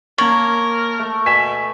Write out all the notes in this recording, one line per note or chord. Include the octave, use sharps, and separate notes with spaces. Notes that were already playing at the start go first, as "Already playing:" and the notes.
A#3 A#4 C#5 A5 F#7
A3
B2 G#5 B6 E7